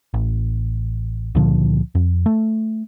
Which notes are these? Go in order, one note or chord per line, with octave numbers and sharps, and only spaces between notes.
A1
C#2 A#2 D3 F3
F2
A3